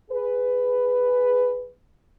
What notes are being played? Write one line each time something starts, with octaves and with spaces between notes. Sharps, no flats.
G#4 B4